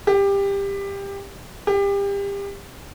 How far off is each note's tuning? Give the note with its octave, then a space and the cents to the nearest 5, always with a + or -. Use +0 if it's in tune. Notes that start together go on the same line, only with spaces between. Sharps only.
G4 +20
G4 +30